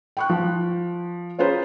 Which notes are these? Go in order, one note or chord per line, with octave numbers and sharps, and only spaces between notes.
G5 C#6 F#6
F3
C#4 F4 G#4 B4 C5 A#5